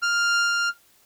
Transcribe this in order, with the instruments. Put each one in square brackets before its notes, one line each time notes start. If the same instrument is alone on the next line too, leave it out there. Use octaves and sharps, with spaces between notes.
[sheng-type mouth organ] F6